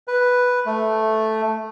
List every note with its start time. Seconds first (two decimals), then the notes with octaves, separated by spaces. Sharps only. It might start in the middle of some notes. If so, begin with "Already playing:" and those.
0.08 B4
0.66 A3